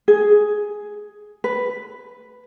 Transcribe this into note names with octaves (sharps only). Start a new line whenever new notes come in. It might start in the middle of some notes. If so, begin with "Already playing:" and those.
G#4
B4